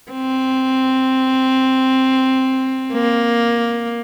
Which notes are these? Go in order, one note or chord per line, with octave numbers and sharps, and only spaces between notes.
C4
A#3